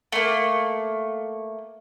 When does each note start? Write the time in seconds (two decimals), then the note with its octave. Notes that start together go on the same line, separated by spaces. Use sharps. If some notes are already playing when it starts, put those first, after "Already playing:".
0.12 A3 A#3